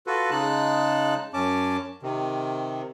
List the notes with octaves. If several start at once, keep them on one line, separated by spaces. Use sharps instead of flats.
F4 F#4 A4 B4
C#3 G#3 D#4 A5 F#6
F#2 C#4 A5 D6
C3 D#3